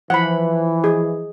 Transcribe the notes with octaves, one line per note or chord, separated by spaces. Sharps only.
E3 F3 F#5 B5
G#4